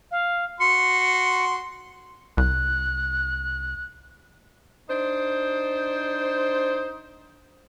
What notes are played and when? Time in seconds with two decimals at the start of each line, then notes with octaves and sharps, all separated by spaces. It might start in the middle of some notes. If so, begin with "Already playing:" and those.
0.11 F5
0.60 F#4 C6 C#7
2.37 C2 F#6
4.90 D4 D#4 C5